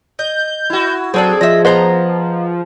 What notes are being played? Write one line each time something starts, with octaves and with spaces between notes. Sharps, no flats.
D#5 G6
E4 F#4
F#3 C4 D4 G#4 A4
F3 D#5 E5
B3 C5 D#5 F#5 A#5